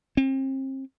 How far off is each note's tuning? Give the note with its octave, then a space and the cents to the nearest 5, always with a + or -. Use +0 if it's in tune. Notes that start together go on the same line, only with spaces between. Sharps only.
C4 +35